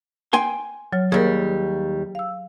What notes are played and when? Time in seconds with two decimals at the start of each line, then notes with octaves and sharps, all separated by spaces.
0.33 G5 G#5 C6
0.93 F#3 C#5 F6
1.12 D#2 G3 G#4 A#4
2.15 F5 E6